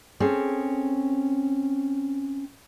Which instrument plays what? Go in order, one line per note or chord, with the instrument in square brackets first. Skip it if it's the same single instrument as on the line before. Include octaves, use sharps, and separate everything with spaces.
[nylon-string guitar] C4 C#4 G#4 A4